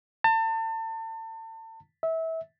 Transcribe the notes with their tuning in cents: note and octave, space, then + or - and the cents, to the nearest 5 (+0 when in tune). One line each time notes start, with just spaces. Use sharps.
A5 +35
E5 -25